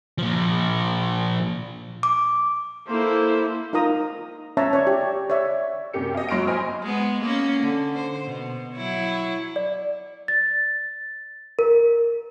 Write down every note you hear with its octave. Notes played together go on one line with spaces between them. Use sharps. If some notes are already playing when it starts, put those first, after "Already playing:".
A#2 F3
D6
A#3 E4 A4 C5
D#4 F4 A#4 A#5 D#6
C#4 C#5 E5 A5 A#5
C#5 D5
G4
C#5 D5 E5
F#2 C3 A#3 G4 C#7
D#5 F5
F#3 C6 C#6 F6 A#6 D7
C5 D#5 G#5 B5 C6 F6
G#3 B3
A#3 C#4
D3
C5
B2
F#3 E4 C#5
D5
A6
A#4